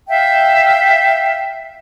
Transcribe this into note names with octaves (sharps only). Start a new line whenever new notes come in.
E5 F5 G5